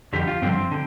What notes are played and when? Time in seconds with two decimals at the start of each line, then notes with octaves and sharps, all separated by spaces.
0.13 F2 D3 F3 G4
0.28 F4
0.42 G2 D3 F3 C4
0.71 D3